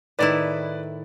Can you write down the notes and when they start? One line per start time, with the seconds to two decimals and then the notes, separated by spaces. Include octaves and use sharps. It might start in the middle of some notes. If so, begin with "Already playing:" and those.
0.19 A2 D#3 E4 B4 D5 A6